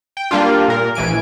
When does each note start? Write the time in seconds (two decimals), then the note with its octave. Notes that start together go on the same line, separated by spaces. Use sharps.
0.17 G5
0.31 G3 A#3 D4 F4
0.68 A#2 A#4
0.95 A#1 E3 G#5 D7